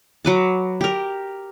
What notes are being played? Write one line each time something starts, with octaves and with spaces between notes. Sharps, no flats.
F#3 B4 D6
G4 A#4